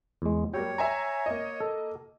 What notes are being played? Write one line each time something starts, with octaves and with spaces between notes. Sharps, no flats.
E2 G#3
F#3 G3 A#3 C#5 G5
E5 G#5 A#5
A#3 D#5
A4